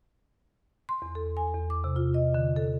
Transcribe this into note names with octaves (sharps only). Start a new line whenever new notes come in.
C6
E2
A4
G#5
E2
D6
C3
F4
D#5
D3
A4